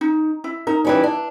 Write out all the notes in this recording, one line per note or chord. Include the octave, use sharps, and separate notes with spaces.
D#4
E4
D#4 A#4
E3 G3 C#4
D4